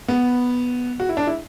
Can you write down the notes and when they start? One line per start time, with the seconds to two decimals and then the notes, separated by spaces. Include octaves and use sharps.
0.08 B3
1.00 F#4
1.09 E4
1.17 D4
1.27 E4